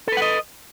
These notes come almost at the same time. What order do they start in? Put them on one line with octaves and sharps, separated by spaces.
A4 B4 F#5 D#5